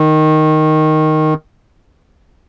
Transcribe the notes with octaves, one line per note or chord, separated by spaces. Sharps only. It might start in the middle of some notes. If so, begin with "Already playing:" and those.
Already playing: D#3